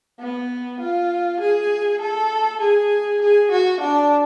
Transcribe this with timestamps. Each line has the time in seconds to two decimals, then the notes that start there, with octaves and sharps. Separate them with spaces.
0.20 B3
0.81 F4
1.41 G#4
2.01 A4
2.61 G#4
3.22 G#4
3.51 F#4
3.81 D4